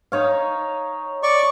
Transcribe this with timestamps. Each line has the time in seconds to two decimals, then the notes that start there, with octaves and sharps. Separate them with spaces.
0.12 D#4 C#5 F5
1.23 D5 C#6